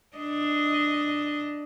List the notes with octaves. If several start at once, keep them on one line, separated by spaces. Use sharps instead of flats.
D4 D#5